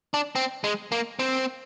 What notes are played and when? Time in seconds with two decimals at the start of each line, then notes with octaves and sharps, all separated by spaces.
0.14 D4
0.35 C4
0.64 G#3
0.92 A#3
1.19 C4